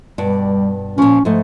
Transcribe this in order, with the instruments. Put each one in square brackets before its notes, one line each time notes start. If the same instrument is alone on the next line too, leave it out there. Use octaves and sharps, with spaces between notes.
[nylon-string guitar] G2 B2 D5 [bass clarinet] G3
[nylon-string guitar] A#2 F3 [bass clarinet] C#4
[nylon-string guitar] G#2 A3 [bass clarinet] F3